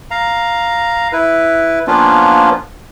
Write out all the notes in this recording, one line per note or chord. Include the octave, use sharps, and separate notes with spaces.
F5 A#5
E4 B4
F3 A#3 B3 C#4 D4 F4